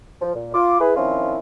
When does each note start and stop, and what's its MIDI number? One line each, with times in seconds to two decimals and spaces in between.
0.22 0.34 53
0.35 0.53 46
0.54 0.78 65
0.54 0.78 84
0.54 0.78 86
0.80 0.95 64
0.80 0.95 68
0.80 0.95 71
0.97 1.39 51
0.97 1.39 53
0.97 1.39 60
0.97 1.39 61
0.97 1.39 64
0.97 1.39 65